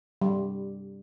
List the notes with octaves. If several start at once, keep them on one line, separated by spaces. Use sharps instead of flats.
G3